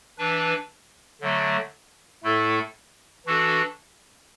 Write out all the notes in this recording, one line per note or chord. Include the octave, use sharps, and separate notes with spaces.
E3 D4 B4
D3 F#3 A3
A2 A3 E4 A4
E3 D4 F#4 A4